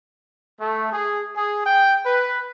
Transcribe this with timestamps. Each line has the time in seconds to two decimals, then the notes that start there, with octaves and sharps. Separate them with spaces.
0.60 A3
0.92 G#4
1.36 G#4
1.66 G5
2.05 B4